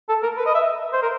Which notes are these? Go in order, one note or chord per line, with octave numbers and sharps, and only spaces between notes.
A4
A#4
B4
D#5
E5
C5
A#4